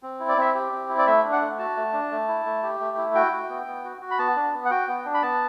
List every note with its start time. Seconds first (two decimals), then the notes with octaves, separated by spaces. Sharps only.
0.03 C4
0.20 E4
0.29 D5
0.38 C4 E5
0.55 G4
0.72 C4
0.89 E4
0.98 D5
1.07 A3 E5
1.24 D4
1.32 F#5
1.41 A3
1.59 F#4 A5
1.76 A3
1.93 D4
2.11 A3
2.28 E4
2.46 A3
2.63 G4
2.80 A3
2.97 E4
3.15 F#4 G5
3.32 F#4
3.49 B3
3.67 B3
3.84 F#4
4.01 F#4
4.11 B5
4.19 B3 A5
4.36 D4
4.53 B3
4.65 F#5
4.71 F#4 G5
4.88 B3
5.05 D4
5.14 B5
5.22 B3 A5